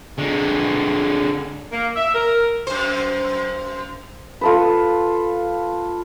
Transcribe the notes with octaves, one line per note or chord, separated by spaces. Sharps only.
D3 G#3
A#3
E5
A#4
F#2 C5
F4 A4 B4